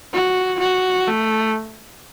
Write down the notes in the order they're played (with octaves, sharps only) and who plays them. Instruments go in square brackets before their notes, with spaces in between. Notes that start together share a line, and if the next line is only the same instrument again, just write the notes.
[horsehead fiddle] F#4
F#4
A3